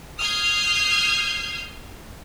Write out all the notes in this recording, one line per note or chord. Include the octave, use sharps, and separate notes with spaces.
D#6 F6 G6 G#6 C7